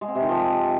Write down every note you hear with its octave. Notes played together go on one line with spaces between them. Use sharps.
G#3
C4
C3
D#3
F3